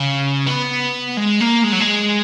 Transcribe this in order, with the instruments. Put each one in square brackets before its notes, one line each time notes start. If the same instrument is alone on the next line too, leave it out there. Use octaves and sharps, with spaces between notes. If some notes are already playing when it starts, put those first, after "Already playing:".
Already playing: [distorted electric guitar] C#3
B3
G#3
A#3
G#3
F#3
G#3